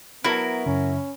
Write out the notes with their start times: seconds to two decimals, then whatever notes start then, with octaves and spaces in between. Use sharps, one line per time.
0.24 F#3 B3 E4 F#4 A#4
0.66 F#2 C#3 C#4